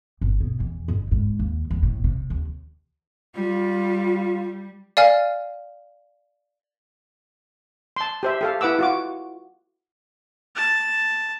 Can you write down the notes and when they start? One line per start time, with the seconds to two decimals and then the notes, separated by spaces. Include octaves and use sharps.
0.21 G1
0.40 B2
0.60 E2
0.88 G1
1.11 G#2
1.39 D#2
1.70 E2
1.83 A2
2.04 C3
2.30 D#2
3.36 G3 F4
4.97 D5 F5 G#5 F6
7.96 A5 C6
8.23 G4 C5 E5
8.41 G4 A4 F5
8.61 E4 B4 F#5 D6 E6
8.79 F4 F#4 D6
10.56 A5